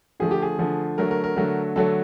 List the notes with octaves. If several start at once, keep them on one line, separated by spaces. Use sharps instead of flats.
D3 F3 A3 G#4
G4
G#4
D3 F3 A3
D3 F#3 A3 A#4
A#4
A#4
D3 F#3 A3
D3 F#3 A3 A4